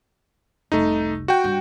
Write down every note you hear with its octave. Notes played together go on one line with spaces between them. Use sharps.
F1 C2 A3 D#4
F#4 G5
G2